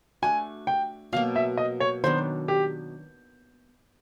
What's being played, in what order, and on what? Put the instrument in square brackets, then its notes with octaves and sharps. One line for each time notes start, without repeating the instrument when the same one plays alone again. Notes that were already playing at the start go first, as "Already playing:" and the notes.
[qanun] A3 D4 F#4 [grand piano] G#5
[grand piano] G5
[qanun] B2 F#3 A#3 [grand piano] F5
[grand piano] E5
D#5
C#5
[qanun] D#3 F#3 B3 D4 [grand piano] C5
[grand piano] G4